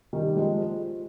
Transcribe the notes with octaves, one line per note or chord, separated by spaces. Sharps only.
D#3 G3
F3 G#3